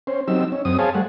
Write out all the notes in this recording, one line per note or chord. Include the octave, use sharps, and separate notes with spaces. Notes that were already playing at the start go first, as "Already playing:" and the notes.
C#4 C5
F#3 C4 D#4 G4 E6
C#4
F#2 C4 D#6
G#4 C5 C#5 F5 G#5 A5
G3 A3 F#5